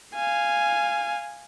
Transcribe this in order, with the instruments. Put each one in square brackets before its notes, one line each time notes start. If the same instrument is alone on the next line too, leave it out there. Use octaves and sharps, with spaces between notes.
[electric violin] F5 G#5